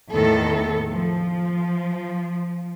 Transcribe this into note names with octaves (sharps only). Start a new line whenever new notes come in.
E2 A2 D#3 B3 A4
F3